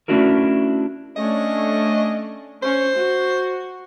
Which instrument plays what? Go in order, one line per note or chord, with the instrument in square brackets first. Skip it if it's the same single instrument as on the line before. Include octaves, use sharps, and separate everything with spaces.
[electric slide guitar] A3 C#4 D4 E4 F#4 A#4
[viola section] A3 C#4 D4 [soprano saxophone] D#5
[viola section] C#4 [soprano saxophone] C5
[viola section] F#4